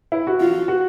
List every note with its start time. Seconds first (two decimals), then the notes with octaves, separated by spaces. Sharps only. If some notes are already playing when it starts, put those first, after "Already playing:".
0.12 E4
0.27 F#4
0.40 F4
0.68 F#4